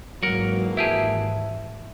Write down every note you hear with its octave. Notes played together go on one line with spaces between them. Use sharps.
G#1 G#2 E3 F#3 A#3 F#4 A#4 F#5
E4 G4 G#4 E5 A5